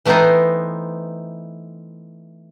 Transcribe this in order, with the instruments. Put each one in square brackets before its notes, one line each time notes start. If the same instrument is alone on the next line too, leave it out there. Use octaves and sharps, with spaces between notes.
[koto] E3 A3 B3 C4 D#4 C5